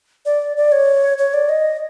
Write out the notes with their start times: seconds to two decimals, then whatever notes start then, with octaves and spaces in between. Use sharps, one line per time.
0.26 D5
0.57 D5
0.72 C#5
1.18 C#5
1.34 D5
1.49 D#5